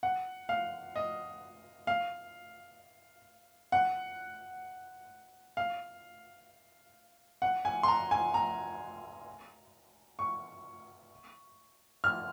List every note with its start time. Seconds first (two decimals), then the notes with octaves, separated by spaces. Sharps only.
0.03 F#5
0.49 F5
0.96 D#5
1.87 F5
3.72 F#5
5.57 F5
7.42 F#5
7.65 G#5
7.83 C6
7.88 A#5
8.11 G#5
8.34 A#5
10.19 C#6
12.04 F6